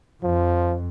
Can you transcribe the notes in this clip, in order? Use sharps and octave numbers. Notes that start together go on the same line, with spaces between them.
F2 F3